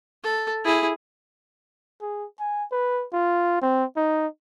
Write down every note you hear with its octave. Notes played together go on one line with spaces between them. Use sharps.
A4
E4 G#4
G#4
G#5
B4
F4
C4
D#4